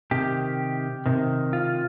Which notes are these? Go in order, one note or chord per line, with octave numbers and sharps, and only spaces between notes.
C3 D#3 G4
C3 D#3
F4